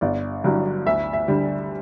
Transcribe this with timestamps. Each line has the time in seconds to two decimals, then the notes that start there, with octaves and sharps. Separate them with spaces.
0.01 G1 D5
0.44 G2 D3 F#3
0.86 D2 E5
1.13 E5
1.28 D3 G3